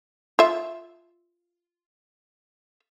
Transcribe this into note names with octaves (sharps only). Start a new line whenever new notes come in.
F4 E5